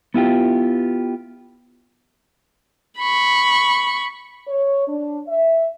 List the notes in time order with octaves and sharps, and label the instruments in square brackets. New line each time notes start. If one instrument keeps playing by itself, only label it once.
[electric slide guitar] B3 E4 F4 G4
[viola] B5 C#6
[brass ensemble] C#5
D4
E5